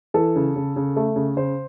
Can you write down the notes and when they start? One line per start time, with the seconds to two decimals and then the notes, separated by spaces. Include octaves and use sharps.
0.14 E3 A4
0.36 C#3
0.56 C#3
0.76 C#3
0.96 A3
1.16 C#3
1.37 C#3 C5